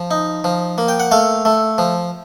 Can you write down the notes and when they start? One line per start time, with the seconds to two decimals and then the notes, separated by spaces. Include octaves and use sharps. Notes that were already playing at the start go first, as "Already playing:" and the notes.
Already playing: F3
0.11 D#4
0.44 F3
0.78 A#3
0.88 G5
1.00 F#5
1.11 A3 F5
1.45 A3
1.78 F3